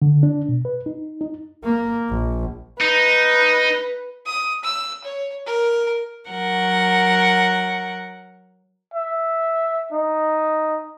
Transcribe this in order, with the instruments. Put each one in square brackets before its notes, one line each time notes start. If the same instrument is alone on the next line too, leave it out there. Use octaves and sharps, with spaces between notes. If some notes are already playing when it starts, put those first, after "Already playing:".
[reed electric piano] D3
D4
B2
B4
D#4
D#4
[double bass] A#3
A#1
[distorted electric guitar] D#4 [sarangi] B4
[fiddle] D#6
E6
C#5
A#4
[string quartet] F#3 A#4 F#5
[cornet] E5
D#4